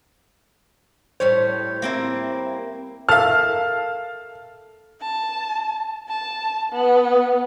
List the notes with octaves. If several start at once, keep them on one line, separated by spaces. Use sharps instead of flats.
A2 G3 C5 C#5
A#3 C4 E4
A4 A#4 E5 F5 A5 F6
A5
A5
B3